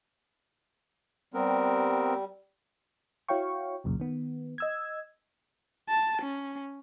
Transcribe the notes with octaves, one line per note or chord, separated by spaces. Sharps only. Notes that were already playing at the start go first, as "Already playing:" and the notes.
G3 B3 C4 A#4
E4 F#4 C#5 F5 G5 C#6
C2 F#2 A#2 C#3
D#3 B3
D#5 E6 G#6
A5
C#4